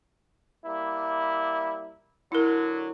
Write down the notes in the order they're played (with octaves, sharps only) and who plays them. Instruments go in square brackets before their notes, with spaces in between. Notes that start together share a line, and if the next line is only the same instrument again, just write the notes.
[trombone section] G3 A#3 E4
[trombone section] D3 F#3 [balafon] E4 A#4